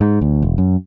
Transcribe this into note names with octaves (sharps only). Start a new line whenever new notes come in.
G#2
D2
E1
F#2